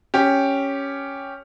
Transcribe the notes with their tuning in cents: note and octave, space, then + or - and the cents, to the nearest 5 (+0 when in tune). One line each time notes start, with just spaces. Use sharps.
C#4 +0 G4 +0